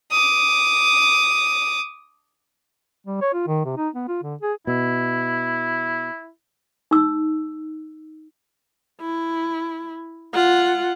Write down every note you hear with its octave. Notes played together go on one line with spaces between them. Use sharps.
D6 D#6
G3
C#5
F4
D#3
C3
D#4
B3
F4
D3
G#4
B2 E4
D#4 E6
E4
F4 F#5